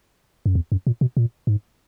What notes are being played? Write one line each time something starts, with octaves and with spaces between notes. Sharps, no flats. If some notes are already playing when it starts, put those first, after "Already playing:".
F#2
E2
F#2
A#2
B2
A#2
G#2